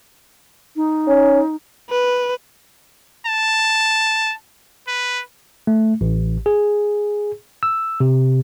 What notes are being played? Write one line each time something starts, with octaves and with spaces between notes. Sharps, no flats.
D#4
C#4
B4
A5
B4
A3
A1
G#4
E6
C3